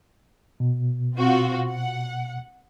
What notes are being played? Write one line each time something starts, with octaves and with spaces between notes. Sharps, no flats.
B2
C4 F4 F#4
F#5